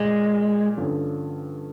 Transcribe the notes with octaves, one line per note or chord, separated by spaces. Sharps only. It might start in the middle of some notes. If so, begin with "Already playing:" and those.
Already playing: A#2 G#3
G2 D3 F3 A3 C#4